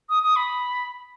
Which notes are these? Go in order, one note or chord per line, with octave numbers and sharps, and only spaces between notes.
D#6
D#6
B5